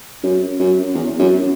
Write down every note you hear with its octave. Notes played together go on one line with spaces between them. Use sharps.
F#2
F#2
E2
F#2